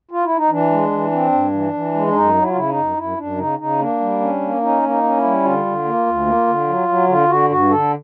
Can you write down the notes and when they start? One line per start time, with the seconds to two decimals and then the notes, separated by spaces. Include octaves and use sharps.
0.11 F4
0.24 E4
0.37 D#4
0.50 E3 D4
0.71 G#3
0.91 E3
1.12 C4
1.32 G2
1.53 E3
1.73 E3
1.94 G#3
2.07 D4
2.14 F#2 D#4
2.35 F#3
2.42 E4
2.50 F4
2.56 C#3 E4
2.70 D#4
2.76 F#2
2.97 F#2 E4
3.17 F#2 D4
3.38 C#3 D#4
3.59 C#3 D#4
3.79 A#3 D4
4.00 G3
4.21 C#4
4.41 A#3
4.57 D4
4.62 C#4 D#4
4.82 A#3
4.89 D#4
5.03 C#4
5.17 E4
5.23 G3
5.44 D3 F4
5.65 D3
5.85 A#3
6.06 D2
6.26 A#3
6.47 D3
6.68 F#3
6.88 F#3
7.08 D3 F4
7.29 D3 F#4
7.49 G2 F#4
7.70 D3 A4